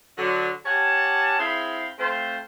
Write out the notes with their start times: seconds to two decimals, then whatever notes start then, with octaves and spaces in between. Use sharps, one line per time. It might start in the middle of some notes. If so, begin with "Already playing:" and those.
0.18 D3 F#3
0.65 C#4 G4 C#5 F#5 A5
1.39 C4 E4 G#4 C5 F5 B5
1.99 A3 C4 F4 C5